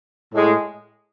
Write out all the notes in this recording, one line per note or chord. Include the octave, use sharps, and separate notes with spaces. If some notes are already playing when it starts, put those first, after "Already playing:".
A2 G#3